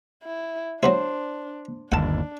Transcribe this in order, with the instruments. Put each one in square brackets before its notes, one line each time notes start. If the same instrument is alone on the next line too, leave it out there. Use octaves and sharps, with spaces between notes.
[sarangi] E4
[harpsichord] F#3 B3 E4 [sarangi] D4 [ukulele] C5
[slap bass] G1 D#2 [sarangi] D4 [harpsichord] F#5 A5